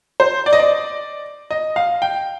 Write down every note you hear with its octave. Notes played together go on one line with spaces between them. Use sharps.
C5
D5
D#5
D5
D#5
F5
G5